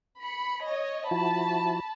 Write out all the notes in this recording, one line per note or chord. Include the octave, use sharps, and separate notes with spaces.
B5 C#7
C#5 D#5
F3 E4 F#4 A5 B5